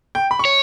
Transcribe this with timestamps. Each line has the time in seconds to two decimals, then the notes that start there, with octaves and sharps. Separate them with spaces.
0.15 G5
0.31 B5
0.39 C#6
0.45 C#5